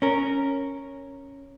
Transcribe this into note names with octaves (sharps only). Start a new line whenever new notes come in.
C#4 A#4